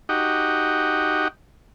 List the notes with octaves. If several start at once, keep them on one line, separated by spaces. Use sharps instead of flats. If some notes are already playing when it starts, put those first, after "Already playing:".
D#4 F#4 G4